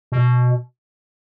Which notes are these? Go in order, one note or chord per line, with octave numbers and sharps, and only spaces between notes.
B2